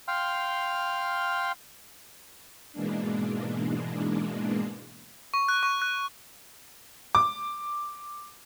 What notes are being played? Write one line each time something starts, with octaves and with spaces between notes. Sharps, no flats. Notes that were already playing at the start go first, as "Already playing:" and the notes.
F5 G5 C6 F6
G#2 B2 E3 G#3 A#3 D4
C#6
F#6
C#6
F#6
D6